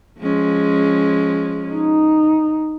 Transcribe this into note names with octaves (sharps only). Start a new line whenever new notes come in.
F3 G#3 C#4
D#4